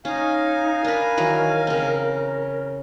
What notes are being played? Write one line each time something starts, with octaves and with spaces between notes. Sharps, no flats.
C#4 D#4 F5 G#5
D4 A#4 B4
D#3 E3 F#3
C#3 C4